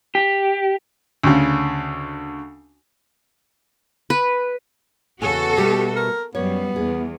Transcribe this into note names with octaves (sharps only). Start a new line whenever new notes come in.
G4
D2 C#3
B4
E2 C#3 B3 F#4 A4 G#5
B2 G3 A3 G4
A#4
F#2 G3 B3 C#5
E2 G#4